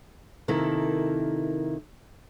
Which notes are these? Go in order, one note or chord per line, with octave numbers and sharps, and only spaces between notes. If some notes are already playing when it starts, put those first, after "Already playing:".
C3 D#3 A#3 E4 A4